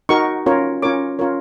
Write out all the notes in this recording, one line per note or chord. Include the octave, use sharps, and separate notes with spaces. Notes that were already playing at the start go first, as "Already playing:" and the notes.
D#4 F#4 A#4 C#6
C#4 F4 A#4 C#5
C#4 F4 A#4 C#5 D6
C#4 F4 A#4 C#5